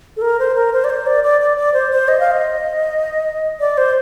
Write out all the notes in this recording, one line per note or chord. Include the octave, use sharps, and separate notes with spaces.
A4
A#4
C5
A#4
C5
D5
C5
D5
D5
D5
D5
C5
C5
D#5
F5
D#5
D5
C5